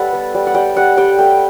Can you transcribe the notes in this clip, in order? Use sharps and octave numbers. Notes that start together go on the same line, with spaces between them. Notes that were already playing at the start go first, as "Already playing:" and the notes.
Already playing: G3 A4 B4 F#5
B3
G3
F#5
G3 G5
G3 F#5
G3 G5
A3 G5